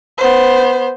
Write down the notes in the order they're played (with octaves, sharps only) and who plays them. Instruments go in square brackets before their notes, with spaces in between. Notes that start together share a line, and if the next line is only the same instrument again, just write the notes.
[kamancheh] B3 C5